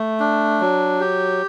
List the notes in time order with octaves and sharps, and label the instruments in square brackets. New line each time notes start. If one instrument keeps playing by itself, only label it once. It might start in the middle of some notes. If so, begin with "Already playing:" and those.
Already playing: [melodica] A3
D4
F#3
G4